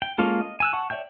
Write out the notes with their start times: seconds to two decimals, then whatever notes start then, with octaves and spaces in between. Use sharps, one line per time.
0.02 G5
0.18 G#3 A#3 C#4 F4 A4
0.41 D#5
0.60 G#5 E6 F#6
0.73 F#5 A5 C#6
0.90 C#5 D5 E5 G5 G6